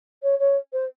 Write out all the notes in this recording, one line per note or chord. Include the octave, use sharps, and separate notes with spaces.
C#5
C#5
C5